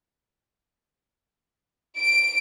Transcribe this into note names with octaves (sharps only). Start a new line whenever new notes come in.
D7